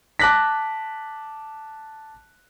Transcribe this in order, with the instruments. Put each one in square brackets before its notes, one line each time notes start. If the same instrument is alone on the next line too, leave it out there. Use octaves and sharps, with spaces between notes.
[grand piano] A5 D6 F#6 A#6 B6